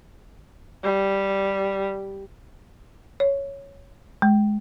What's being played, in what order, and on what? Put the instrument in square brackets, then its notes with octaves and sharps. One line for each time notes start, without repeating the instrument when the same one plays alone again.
[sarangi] G3
[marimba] C#5
G#3